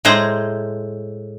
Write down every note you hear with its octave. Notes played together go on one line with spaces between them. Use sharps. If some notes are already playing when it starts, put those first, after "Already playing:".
A2 G#3 C5 A#5